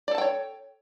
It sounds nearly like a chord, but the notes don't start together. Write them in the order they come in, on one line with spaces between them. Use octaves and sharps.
D5 A4 A5 G5 C#5